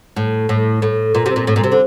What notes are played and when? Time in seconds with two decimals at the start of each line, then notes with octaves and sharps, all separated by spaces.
0.16 A2
0.49 A2
0.82 A2
1.15 A#2
1.26 C3
1.36 A#2
1.47 A2
1.56 A#2
1.64 C3
1.72 D3